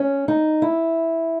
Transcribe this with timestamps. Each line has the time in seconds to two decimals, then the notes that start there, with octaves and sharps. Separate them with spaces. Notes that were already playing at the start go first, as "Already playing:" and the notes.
Already playing: C#4
0.28 D#4
0.62 E4